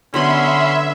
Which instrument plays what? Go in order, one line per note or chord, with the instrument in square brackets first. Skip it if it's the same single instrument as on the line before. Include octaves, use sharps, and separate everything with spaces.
[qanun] D3 F#3 B3 [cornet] C#4 [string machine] E5 [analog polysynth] B5 C6